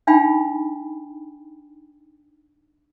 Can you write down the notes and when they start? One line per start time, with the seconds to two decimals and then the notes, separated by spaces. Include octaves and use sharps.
0.07 D4 D#4 F5 G5 G#5 B5